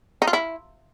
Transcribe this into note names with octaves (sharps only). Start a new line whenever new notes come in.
D#4
F4
E4